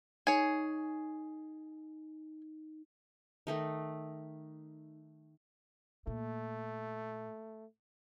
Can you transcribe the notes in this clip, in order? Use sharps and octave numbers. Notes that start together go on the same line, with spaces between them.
D#4 G#4 C#5
D#3 A3 D#4
A#2 A3